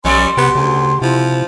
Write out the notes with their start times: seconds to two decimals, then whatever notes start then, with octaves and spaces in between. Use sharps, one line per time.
0.05 B1 F3 G3 C#4 D5 C6
0.37 C3 B3 F#4 G4
0.55 D2 C#3
1.02 C3 F3 E4